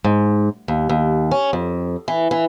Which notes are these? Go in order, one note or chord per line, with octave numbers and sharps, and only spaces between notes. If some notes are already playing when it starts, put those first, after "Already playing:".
G#2
D#2
D#2
C#4
F2
E3
E3